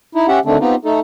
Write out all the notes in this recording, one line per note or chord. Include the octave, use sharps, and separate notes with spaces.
D#4 E4
C#4 G4 E5 F#5
D3 D#3 A3 C4 D4
B3 C4 D#4 F4 G4
A3 D#4 A4